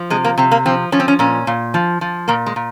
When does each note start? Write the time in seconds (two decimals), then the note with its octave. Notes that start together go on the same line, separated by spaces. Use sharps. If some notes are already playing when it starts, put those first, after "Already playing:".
Already playing: F3
0.10 C3 G#3
0.24 A#3
0.37 C3 C4
0.51 A#3
0.66 F3 C4
0.92 F3 C#4
1.00 C4
1.08 C#4
1.19 A#2 C#4
1.47 A#2
1.74 F3
2.01 F3
2.28 A#2 A#3
2.46 G#3
2.56 A#2